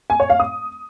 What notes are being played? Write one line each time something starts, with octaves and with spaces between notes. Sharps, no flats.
G#5
C#5
F5
D#6